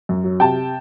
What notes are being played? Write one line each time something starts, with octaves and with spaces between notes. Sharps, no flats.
F#2
F#3
C3 G5 A5